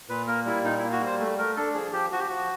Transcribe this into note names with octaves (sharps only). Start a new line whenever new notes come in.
A#2 B4
A#3 A#4
G3 E4
A#2 D#4
E4
A#3
F#4
G3 C5
A3
A3 A#4
D4 A4
F3 G#4
F3 G4
F3 F#4
G4
F3 F#4